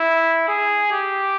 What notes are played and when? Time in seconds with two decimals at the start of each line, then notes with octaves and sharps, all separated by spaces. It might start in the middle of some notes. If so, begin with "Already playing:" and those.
Already playing: E4
0.48 G#4
0.91 G4